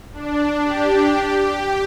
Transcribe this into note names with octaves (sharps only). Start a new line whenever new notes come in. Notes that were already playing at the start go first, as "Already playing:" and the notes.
D4
G4
G4